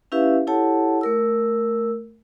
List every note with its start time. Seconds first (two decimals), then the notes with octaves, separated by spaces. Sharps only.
0.12 C#4 E4 G4 B4 E5 F5
0.47 E4 G4 A4 C#5 F#5 A5
1.01 A3 A#4 E6